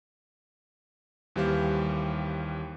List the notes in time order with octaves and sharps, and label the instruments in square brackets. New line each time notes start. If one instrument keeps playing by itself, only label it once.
[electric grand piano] D#2 E3 G3 G4 C5 F5